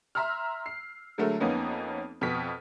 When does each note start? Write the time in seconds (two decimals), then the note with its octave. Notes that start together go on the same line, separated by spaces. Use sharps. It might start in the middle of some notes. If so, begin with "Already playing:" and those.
0.15 E5 A#5 C6 E6 F6
0.66 C7
1.18 D3 F#3 G#3 A3 A#4
1.40 F2 A#3 B3 C#4 D#4
2.21 F2 B2 B3 F6 B6